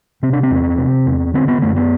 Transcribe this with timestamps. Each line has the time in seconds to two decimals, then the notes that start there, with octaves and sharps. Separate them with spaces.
0.23 C3 C4
0.33 D4
0.43 C4
0.51 E2
0.78 C3
1.06 E2
1.34 D3 C4
1.48 B3
1.62 F#2 A3
1.76 B3